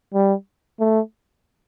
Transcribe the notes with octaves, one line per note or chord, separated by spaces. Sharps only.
G3
A3